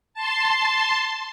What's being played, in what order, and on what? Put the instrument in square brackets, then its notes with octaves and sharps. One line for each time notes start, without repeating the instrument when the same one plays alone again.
[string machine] A5 C6